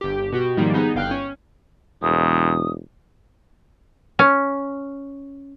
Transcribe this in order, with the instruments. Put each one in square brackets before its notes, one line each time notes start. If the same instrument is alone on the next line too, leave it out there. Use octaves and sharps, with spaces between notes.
[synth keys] G1 G4
B2 F#4 G4
G#2 D#3 F3 G3 A#3
B3 D#4 G#4
G1 F5 G5 F6 F#6
C#4
[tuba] E1 [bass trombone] E2 [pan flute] D#6
[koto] C#4